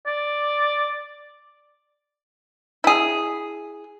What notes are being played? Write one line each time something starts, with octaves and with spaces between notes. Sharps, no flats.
D5
E4 G#4